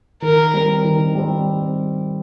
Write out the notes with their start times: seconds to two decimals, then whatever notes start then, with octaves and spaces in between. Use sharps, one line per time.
0.22 D#3 A#4
0.54 G3 C4
0.84 D#3
1.15 G3 C4